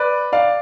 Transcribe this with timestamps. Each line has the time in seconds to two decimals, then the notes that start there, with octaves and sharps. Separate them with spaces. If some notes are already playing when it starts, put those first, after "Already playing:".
Already playing: B4 D5
0.32 D5 F5